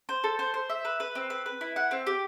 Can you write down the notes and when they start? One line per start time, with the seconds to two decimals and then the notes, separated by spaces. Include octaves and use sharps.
0.09 C5
0.24 A4
0.39 C5
0.54 C5
0.70 E5
0.85 B4
1.00 B4
1.15 C4
1.30 B4
1.46 B4
1.61 E4
1.76 F#5
1.91 C4
2.07 G4